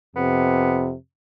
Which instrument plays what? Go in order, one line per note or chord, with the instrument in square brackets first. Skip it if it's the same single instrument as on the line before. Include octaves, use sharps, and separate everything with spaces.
[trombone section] F2 C3 [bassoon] B3